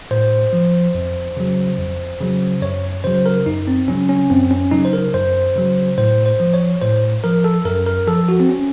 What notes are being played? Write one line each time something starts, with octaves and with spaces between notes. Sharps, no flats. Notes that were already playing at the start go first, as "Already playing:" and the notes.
A2 C5
F3
F2
C#3 F#3
F2
C#3 F#3
F#2 C#5
C#3 F#3 C5
A#4
F#2 D#4
C4
C#3 F#3 C#4
C#4
F#2 C4
C#4
C#3 F#3 D#4
C5
A#4
F#2 C5
C#3 F#3
A2 C5
C5
F3
C#5
A2 C5
F3 A#4
A4
F#2 A#4
A#4
F3 A4
F#4
C4
C#4